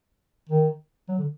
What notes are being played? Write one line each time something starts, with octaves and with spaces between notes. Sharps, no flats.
D#3
F#3
D3